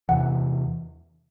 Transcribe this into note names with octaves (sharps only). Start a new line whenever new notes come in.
E2 C3 E3 F#5